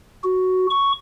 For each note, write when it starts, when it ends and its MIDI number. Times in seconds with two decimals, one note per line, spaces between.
0.24 0.67 66
0.70 0.92 85